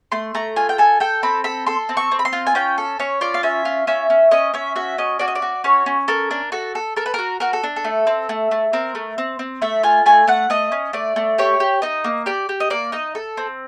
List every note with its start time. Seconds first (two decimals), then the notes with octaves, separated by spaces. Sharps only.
0.12 A3 C6
0.35 A3 A#5
0.56 F4 G#5
0.69 G5
0.78 A4 G#5
1.00 A4 G5
1.23 C4 B5
1.44 A4 B5
1.66 A4 C6
1.89 C4
1.97 C#6
2.11 C4
2.19 B5
2.25 C6
2.33 F4
2.47 G#5
2.55 C#4 G5
2.78 A4
2.99 C#4 C#5
3.21 F4 D5
3.34 F5
3.43 C#4 E5
3.65 F4
3.87 C#4 E5
4.10 C#4
4.31 C#4 D#5
4.54 C#4 E5
4.76 F#4 E5
4.98 C#4 D#5
5.19 F#4 D5
5.28 D#5
5.35 D5
5.42 F#4
5.64 C#4 C#5
5.86 C#4
6.08 A4 A#4
6.31 D4
6.52 F#4 A4
6.75 A4
6.96 A4 A#4
7.06 B4
7.14 F#4 A#4
7.40 F#4 A#4
7.53 A4
7.63 D4
7.76 A4
7.84 A3
8.07 C4
8.29 A3
8.51 A3
8.73 C4 A#4
8.95 A3
9.18 C4
9.39 C4
9.62 A3 E5
9.83 F4 G#5
10.06 A3 G#5
10.27 A3 F#5
10.50 A3 D#5
10.72 C#4
10.93 A3 D5
11.16 A3
11.38 G4 C#5
11.60 G4
11.82 D#4 D#5
12.04 A#3
12.26 G4 D5
12.49 G4
12.60 D#5
12.70 A#3 D5
12.92 D#4 D#5
13.15 A4
13.37 C4